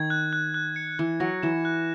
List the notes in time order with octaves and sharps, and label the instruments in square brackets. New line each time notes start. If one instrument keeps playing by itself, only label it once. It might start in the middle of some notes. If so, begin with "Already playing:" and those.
Already playing: [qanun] D#3 [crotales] G#6
[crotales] F#6
F#6
F#6
C#7
[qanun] E3 [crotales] F#6
[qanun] F#3 [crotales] A#6
[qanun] E3 [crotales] E7
[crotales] F#6